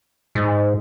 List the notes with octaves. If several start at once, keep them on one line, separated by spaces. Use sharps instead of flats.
G#2